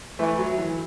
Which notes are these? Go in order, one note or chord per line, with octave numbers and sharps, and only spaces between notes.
E3 A3
F#3
E3